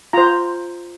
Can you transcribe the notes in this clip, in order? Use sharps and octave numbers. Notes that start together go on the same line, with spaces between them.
F4 C5 A#5